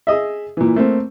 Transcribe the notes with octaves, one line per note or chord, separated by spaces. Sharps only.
G#4 D#5 E5
A#2 E3
A3 A#3 C4